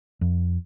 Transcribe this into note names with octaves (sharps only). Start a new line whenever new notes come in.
F2